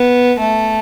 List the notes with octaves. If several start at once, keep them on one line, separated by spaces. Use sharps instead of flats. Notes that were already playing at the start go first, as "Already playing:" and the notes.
Already playing: B3
A3